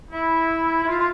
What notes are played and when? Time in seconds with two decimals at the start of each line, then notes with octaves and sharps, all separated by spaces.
0.11 E4
0.83 E4
0.87 F4
0.98 F4